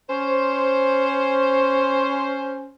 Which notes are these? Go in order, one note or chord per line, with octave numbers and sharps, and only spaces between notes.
C#4 C5